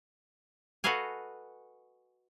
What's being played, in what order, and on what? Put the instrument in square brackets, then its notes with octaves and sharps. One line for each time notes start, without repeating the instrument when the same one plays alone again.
[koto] F#4 A4 B4 D#5 F5 G#5